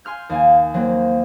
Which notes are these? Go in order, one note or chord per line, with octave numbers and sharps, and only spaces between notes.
G#5 C6 F6 G6
D#2 F5 G#5
F#3 A#3 C4